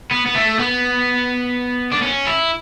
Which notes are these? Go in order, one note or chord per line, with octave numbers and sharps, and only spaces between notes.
B3
B3
A3
B3
D4
C#4
E4